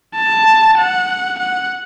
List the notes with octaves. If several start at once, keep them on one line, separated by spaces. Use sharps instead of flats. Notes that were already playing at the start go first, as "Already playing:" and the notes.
A5
F#5
F#5